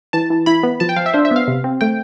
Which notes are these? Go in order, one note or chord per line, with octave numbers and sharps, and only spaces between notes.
E3 A5
E3
E4 B5
B3
F3 A5
G5
F3 F5
E5
D4 C5
E5
B3 F5
C3
C4
A3 G5